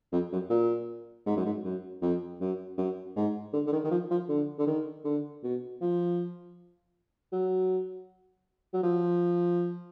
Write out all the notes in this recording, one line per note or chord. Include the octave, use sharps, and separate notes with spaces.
F2
F#2
A#2
G#2
F#2
G#2
F#2
F2
F#2
F#2
G#2
D3
D3
D#3
D#3
F3
F3
D3
D3
D#3
D3
B2
F3
F#3
F#3
F3